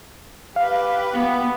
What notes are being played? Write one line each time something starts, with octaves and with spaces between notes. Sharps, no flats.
G4 B4 F5
B3